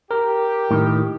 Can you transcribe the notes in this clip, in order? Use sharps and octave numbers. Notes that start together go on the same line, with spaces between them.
G4 A#4
A2 D#3